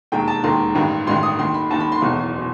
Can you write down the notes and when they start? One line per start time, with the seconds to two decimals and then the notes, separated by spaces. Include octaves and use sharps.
0.12 E1 D#2 D#3 G5
0.28 A5
0.44 E1 D#2 D#3 C6
0.75 A1 G2 D#3
1.07 A1 G2 D#3 C6
1.23 D#6
1.39 D#2 D#3 C6
1.54 B5
1.70 D#2 D#3 A5
1.80 B5
1.92 C6
2.02 F#1 E2 B2
2.38 B2